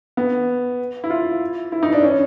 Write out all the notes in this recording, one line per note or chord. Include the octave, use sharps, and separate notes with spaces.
B3
E4
F4
E4
D#4
D4
C#4